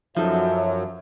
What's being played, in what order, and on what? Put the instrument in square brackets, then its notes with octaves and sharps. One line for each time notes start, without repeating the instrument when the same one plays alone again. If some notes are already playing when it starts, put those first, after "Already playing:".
[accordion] F#2 F#3 [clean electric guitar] F3 [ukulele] D#4 A4 [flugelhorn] E5